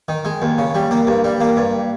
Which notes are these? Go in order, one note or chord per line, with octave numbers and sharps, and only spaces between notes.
D#3
G#3
D#2
C#3
G3
A#3
G2
G3
A#3
G2